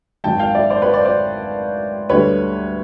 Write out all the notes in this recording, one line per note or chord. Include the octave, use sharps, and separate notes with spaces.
G#1 G#2 D#3 F#3 G5 A5
F5 G5
D5 E5
C5 D5
B4 C#5
C5 D5
C5 D5
D2 D3 G3 B4 C#5